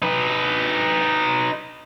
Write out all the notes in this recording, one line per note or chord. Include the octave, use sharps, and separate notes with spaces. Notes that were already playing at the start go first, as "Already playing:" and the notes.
D#4 B4